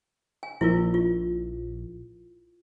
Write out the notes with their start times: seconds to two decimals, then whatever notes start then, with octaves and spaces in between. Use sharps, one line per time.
0.43 G#5
0.61 A#1 E4 F4 A#4
0.94 F4